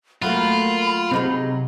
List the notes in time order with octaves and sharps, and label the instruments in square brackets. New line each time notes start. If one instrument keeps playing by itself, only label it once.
[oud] F#3 A3 A#3 [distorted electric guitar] F4 [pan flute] B5
[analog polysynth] C3 [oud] F#3 D#4 G#4